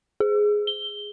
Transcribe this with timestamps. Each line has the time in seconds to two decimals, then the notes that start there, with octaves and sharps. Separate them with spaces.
0.20 G#4
0.67 G7